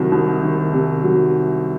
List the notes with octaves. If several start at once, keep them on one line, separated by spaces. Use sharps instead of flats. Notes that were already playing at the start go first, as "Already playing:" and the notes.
Already playing: C2 C3 D#3 F#3
C2
D#3
C3
F#3